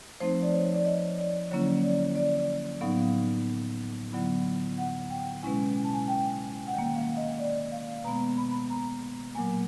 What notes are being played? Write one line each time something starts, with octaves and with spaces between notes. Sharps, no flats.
F3 A3 C4 D#4 C5
D5
C#5
D5
D#5
D5
D3 F#3 A#3 C#4 E4 C#5
D5
D5
D5
A2 F#3 B3 D#4 F5
D3 F#3 B3 E4
F#5
G5
B2 G#3 C#4 E4 G#5
G#5
A5
G#5
G5
F#5
D#3 G3 A#3 G5
F5
D#5
D5
F5
B2 G#3 B3 A#5
B5
B5
A#5
A#2 F#3 A#3 G#5